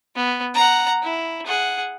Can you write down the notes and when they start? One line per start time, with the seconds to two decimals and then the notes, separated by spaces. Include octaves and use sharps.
0.16 B3
0.55 F#5 A#5
1.03 E4
1.47 G#4 F#5